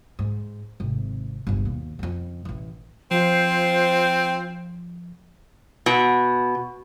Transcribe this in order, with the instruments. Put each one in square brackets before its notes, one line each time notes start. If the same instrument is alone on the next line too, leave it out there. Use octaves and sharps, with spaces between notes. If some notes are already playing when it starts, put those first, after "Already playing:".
[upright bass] G#2
G#1 C3
G1 C#2
D#2 B2
F2 C#3
A1 E3
[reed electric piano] F3 [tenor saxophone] C4 [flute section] F4 C5
[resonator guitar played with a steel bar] B2